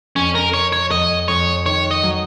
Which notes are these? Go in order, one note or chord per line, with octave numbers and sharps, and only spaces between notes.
F2 C#4
A#4
F2 C#5
C#5
F2 D#5
F2 C#5
D#3 C#5
D#5
F#3